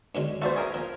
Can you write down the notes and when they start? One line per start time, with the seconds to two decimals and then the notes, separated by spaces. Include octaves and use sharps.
0.15 F#2 D3 G#3
0.42 A3 B3 F#4 C5 D5
0.55 C#4 G#4 A#4
0.74 F3 A#4